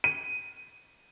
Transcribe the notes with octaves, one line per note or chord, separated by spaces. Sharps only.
D#7